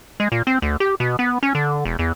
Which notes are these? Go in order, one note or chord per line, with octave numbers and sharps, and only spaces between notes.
G#3
A#2
C4
D2
G4
B2
B3
C#4
D3
E1
E2